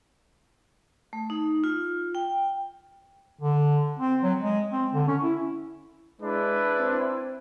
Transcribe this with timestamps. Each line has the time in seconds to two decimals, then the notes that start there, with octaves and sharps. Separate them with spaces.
1.13 A3
1.30 D#4
1.64 F4
2.15 G5
3.40 D3
3.99 C4
4.23 F#3
4.40 G#3
4.71 C4
4.93 D3
5.08 C#4
5.23 E4
6.21 G#3 D4 E4 B4
6.79 C4